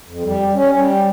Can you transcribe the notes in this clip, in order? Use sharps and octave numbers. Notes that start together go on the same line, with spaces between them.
F2
G3
C#4
G3